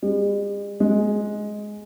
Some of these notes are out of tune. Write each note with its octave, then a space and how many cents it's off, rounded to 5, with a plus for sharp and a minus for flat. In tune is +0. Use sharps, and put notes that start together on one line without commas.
G#3 -45
G#3 +10